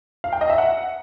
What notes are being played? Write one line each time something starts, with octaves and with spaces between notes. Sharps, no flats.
F5
G5
D#5
E5
F#5